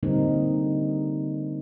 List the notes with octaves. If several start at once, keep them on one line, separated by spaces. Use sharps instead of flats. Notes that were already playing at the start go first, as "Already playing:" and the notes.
D3 G3 A#3 C4 D#4 A#4